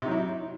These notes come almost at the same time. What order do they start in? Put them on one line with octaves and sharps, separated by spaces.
C3 D#4 F#3 E4